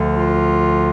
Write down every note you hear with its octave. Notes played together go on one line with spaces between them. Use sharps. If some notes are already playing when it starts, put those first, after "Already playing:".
Already playing: D2 D3 F3
F4